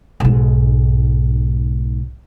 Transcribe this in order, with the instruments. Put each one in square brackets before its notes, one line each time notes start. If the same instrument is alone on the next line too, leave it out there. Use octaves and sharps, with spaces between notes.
[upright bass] B1 G#2